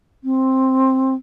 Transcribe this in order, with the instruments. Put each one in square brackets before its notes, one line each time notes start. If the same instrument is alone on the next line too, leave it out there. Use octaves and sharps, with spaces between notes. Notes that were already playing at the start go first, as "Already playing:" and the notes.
[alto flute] C4